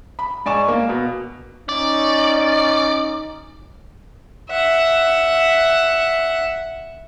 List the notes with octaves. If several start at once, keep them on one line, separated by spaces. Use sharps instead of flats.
B5
G#2 D5 G#5 C#6 E7
A#3
B2
C#4 D#4 D5
E5 F#5